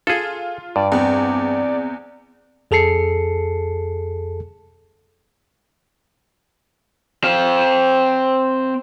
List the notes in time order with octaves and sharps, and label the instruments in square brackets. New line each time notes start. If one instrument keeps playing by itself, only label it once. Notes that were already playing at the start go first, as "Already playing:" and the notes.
[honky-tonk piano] F4 [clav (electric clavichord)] G#4 A4
[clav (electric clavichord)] G2 [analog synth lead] D5
[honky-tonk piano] E2 [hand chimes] C4 [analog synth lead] D5
[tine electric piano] F2 G#4 A4 A5 C7 C#7
[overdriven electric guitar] C4 F5